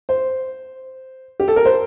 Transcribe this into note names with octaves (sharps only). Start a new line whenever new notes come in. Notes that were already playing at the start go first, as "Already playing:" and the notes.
C5
G4
A4
A#4
C5